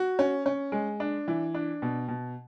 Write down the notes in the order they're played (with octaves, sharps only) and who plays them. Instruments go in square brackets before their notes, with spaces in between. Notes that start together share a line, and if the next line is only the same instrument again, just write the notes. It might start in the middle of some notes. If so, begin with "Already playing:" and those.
Already playing: [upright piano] F#4
C#4
C#4
G#3
D4
E3
D4
B2
B2